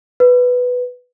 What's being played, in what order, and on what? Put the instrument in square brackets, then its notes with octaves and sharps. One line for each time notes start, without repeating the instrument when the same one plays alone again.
[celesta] B4